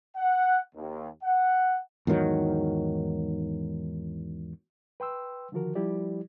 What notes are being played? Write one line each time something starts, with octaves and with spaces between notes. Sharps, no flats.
F#5
D#2
F#5
E2 G#2 D#3 F#3
B4 G5 C6 E6
D3 D#3 F3 F#4 A#4
F3 G3 E4 G4 D5